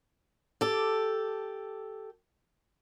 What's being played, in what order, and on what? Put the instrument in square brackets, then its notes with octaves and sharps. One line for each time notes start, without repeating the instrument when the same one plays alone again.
[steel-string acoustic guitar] G4 A4